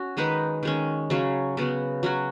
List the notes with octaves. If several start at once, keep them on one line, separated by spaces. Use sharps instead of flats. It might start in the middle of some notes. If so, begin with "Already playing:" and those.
Already playing: C#4 F#4
D#3 G#3 D#4 B4
D#3 G#3 C#4
C#3 F#3 C#4
C#3 B3 F#4
F#3 C#4 F#4